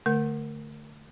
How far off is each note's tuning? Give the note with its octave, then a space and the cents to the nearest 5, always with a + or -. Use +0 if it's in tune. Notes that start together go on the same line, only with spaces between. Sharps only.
D3 +0 A3 +0 A#4 +0